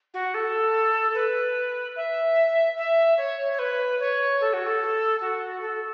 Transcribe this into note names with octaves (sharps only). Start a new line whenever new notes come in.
F#4
A4
B4
E5
E5
C#5
C#5
B4
C#5
A4
F#4
A4
F#4
A4